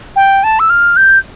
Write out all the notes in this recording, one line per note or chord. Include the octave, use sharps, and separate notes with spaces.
G5
A5
E6
F6
G6